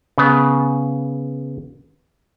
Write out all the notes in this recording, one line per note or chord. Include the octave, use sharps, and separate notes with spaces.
C#3 B3